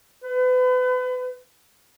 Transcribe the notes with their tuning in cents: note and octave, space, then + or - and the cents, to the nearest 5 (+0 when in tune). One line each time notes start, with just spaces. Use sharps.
B4 +35